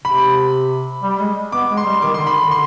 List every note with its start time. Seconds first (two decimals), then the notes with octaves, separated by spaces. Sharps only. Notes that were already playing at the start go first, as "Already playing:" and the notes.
0.04 C3 B5
1.03 G3
1.19 G#3
1.52 B3 D6
1.69 G#3
1.77 C6
1.85 G3
2.02 D#3 D6
2.14 D3 C6
2.26 D#3 B5
2.39 D3
2.51 C6